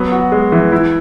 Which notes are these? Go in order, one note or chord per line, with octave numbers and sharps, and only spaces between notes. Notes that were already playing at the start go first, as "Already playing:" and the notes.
Already playing: F#3 B3
F#4
G#3
E3
E4